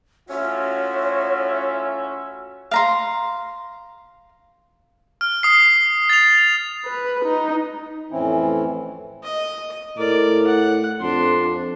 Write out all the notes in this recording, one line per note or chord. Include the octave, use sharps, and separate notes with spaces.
A2 C#4 F4 F#4 C#5 E5
F5 A#5 C6
F6
D#6 C7
A6 F7
B4
D#4
F2 A2 E3 C4 C#4 E4
D#5
A2 A#4 D5
F#5
F2 D4 C6